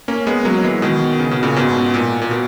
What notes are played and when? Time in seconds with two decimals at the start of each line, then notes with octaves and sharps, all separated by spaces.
0.08 A#3 C#4
0.27 G#3 B3
0.45 F#3 A#3
0.64 E3 G#3
0.82 B2 D#3
1.20 C#3
1.31 B2
1.43 A#2 C#3
1.56 G#2 B2
1.94 A#2
2.22 A#2
2.31 B2